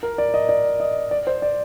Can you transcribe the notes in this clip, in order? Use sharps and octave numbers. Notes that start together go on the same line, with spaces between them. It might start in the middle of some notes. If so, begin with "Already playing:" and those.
A#4
D5
D#5
D5
D#5
D5
C5
D5